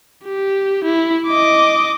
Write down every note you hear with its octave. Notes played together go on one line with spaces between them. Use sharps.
G4
E4
D#5 D6